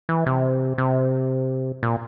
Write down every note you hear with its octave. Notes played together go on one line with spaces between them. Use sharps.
E3
C3
C3
A#2